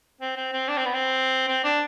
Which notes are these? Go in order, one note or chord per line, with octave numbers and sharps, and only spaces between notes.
C4
C4
C4
D4
C4
B3
C4
C4
D4